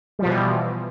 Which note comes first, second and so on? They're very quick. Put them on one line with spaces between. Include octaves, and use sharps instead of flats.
G3 F3 B2 E3